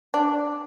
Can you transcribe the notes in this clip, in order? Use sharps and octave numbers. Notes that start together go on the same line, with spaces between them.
D4